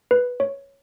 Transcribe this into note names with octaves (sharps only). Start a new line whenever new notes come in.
B4
C#5